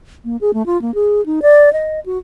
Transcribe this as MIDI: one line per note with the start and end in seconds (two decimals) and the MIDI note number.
0.24 0.37 58
0.41 0.51 68
0.53 0.65 57
0.66 0.80 65
0.81 0.94 58
0.94 1.24 68
1.26 1.40 63
1.42 1.72 74
1.73 2.00 75
2.06 2.18 66